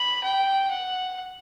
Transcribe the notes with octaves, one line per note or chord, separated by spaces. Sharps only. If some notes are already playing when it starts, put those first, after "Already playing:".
Already playing: B5
G5
F#5